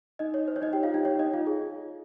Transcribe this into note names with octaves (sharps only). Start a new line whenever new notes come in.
D#4 D#5
C#5
C5
C#5
D#4 D#5
G4 G5
F4 F5
D#4 D#5
C#5
D#4 D#5
F4 F5
G#4